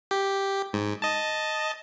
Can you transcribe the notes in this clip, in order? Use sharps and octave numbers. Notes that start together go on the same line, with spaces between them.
G4
G#2
D#5 A5